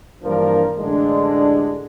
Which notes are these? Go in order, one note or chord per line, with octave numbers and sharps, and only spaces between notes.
G2 E3 F3 A#3 D4 A#4
A1 D3 G#3 D4